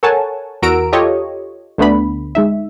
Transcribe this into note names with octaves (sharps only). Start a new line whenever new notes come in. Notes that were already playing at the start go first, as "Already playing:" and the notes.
A4 A#4 C#5 F#5 G#5 A5
E2 F#4 A#4 A#5 E6 D7
F4 G4 A4 C#5 D#5
D2 D3 A3 B3 D4 B5
G#3 D#4 E5